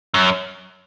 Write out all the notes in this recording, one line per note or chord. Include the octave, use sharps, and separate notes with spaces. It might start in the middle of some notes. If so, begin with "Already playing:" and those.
F#2